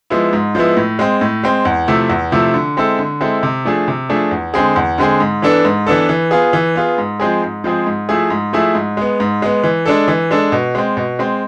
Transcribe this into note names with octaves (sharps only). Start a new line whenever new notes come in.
F3 G#3 B3 E4
G#2
F3 G#3 B3 E4
A2
G#3 C4
A2
G#3 C4
E2
C3 F3 A3 E4
E2
C3 F3 A3 E4
D3
G#3 C4 E4 A4
D3
G#3 C4 E4 A4
C3
F3 A3 D4 G#4
C3
F3 A3 D4 G#4
E2
D3 G#3 C4 G#4
E2
D3 G#3 C4 G#4
G#2
E3 B3 D4 A4
G#2
E3 B3 D4 A4
E3
B3 F4 G#4
E3
B3 F4 G#4
G#2
F3 G#3 C4 G#4
G#2
F3 G#3 C4 G#4
G#2
F3 A3 E4 G#4
G#2
F3 A3 E4 G#4
G#2
G#3 B3
G#2
G#3 B3
E3
G#3 D4 A4
E3
G#3 D4 A4
B2
G#3 C4
B2
G#3 C4